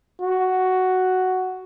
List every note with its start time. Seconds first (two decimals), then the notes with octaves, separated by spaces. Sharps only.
0.22 F#4